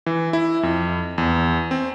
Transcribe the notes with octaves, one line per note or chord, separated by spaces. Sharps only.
E3
E4
F2
E2
C4